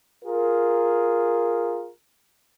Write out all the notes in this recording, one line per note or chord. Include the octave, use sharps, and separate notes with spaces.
F4 G#4 A#4